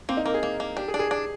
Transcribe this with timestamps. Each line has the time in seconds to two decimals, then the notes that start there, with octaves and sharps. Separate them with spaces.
0.09 A#3 C4
0.17 D#4
0.25 A#3 A#4
0.34 G#4
0.43 A#3
0.60 A#3
0.76 D4 G4
0.88 G#4
0.94 D4
0.99 G#4
1.11 D4